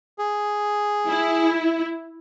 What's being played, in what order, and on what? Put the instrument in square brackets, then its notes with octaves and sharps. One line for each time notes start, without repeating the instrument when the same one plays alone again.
[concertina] G#4
[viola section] E4